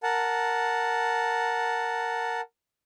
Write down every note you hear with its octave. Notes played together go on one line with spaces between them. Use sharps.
A#4 F#5 A5